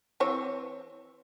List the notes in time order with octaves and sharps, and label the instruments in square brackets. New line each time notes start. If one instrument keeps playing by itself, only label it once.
[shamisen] E3 C4 C#5